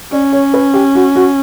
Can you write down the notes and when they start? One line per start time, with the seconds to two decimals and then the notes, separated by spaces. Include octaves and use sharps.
0.12 C#4 D5
0.33 C#5
0.54 B4
0.74 G4
0.95 F#4
1.16 F#4